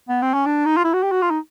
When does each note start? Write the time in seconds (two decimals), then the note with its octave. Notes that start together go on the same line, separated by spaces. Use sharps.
0.09 B3
0.22 C4
0.34 C#4
0.46 D4
0.65 D#4
0.77 F4
0.84 E4
0.93 F#4
1.03 G4
1.11 F#4
1.22 F4
1.30 D#4